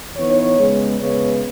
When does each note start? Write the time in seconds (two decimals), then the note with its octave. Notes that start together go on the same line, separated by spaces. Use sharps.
0.18 E3 B3 D#4 C#5
0.58 C#3 G#3 B3
1.00 C#3 G#3 B3 C#5